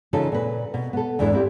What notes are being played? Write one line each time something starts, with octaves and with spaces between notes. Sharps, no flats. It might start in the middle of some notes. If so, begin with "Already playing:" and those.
C#3 E3 D#4 F4 A4
A#2 B4
B2
B3 A4
E2 G#2 E3 D4 E4
C4 E4 G4